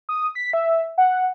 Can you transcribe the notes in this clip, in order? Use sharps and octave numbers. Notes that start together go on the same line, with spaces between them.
D#6
B6
E5
F#5